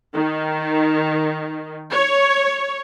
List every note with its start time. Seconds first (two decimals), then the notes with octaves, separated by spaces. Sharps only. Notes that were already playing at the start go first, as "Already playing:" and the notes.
0.14 D#3
1.92 C#5